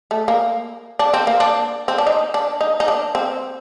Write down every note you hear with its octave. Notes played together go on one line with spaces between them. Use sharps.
A3
A#3
D4
C4
A#3
D4
C4
D4
D#4
D4
D#4
D#4
D4
C4